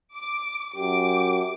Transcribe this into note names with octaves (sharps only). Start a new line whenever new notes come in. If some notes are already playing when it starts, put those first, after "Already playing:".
D6
F#2 G4 D6